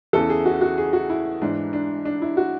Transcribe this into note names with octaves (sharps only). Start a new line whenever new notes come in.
E2 C#3 E3 A4
G#4
F#4
F#4
G#4
F#4
E4
G#2 E3 D4
D4
D4
E4
F#4